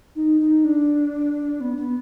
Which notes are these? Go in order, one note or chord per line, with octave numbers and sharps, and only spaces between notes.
D#4
D#4
D4
B3
B3